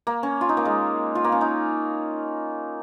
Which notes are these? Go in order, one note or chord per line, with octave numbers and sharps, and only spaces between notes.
A#3
C#4
F4
D#4
A#3
G#3
F4
A#3
C#4
D#4